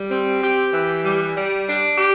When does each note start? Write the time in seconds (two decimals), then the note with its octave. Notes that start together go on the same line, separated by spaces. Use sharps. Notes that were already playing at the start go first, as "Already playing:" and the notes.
Already playing: G3
0.11 C4
0.42 G4
0.74 E3
1.04 G3
1.36 G3
1.67 D4
1.98 G4